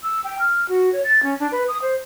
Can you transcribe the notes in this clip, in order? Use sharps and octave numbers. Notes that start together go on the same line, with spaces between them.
E6
G5
F6
F#4
C#5
A6
C#4
D4
B4
D#6
C5